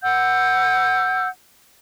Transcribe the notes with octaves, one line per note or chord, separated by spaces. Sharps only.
F#5 E6 G6